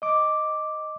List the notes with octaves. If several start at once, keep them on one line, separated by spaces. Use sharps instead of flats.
D#5 D6